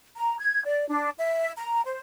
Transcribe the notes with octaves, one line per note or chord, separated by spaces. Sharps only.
A#5
G#6
D5
D4
E5
A#5
C5